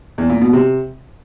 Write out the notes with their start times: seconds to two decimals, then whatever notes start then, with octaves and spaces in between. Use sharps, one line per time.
0.18 E2
0.30 A#2
0.41 B2
0.53 C3